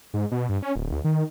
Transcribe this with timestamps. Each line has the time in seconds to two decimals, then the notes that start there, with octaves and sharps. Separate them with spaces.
0.14 G#2
0.32 B2
0.49 G2
0.62 C#4
0.76 D1
0.92 D2
1.04 D#3